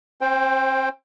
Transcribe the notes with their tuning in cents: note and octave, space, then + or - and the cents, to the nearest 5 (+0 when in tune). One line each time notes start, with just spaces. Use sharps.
C4 +40 C5 +10 G5 +0